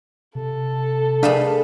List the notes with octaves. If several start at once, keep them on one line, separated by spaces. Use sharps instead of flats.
C3 A4
A3 D4 G#4 B4 F5